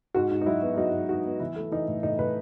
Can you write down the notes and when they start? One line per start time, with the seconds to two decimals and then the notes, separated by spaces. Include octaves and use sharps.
0.14 G#2 F#4
0.31 G#2
0.41 D#4
0.46 F#3 E4
0.62 B3
0.77 F#3 D#4
0.93 G#2
1.09 G#2 F#4
1.25 B3
1.40 E3 E4
1.56 A3
1.72 E3 D#4
1.88 A2
2.03 A2 D#4
2.19 A2 B4